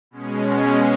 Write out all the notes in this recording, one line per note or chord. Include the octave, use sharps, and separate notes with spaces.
B2 G#3 C#4